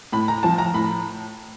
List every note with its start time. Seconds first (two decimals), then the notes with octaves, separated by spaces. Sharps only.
0.12 A2 B5
0.28 A#5
0.43 F3 A5
0.58 A#5
0.74 A2 B5